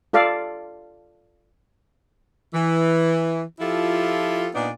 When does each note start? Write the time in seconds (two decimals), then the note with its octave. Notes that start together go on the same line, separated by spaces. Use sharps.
0.13 F4 A4 D5 F5
2.54 E3
3.60 F3 E4 F4 G4 A4
4.54 A#2 B3 D4 D#4 D5